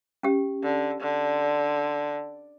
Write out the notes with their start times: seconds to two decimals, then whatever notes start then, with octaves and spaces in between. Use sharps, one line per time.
0.23 C#4 G4
0.63 D3
1.01 D3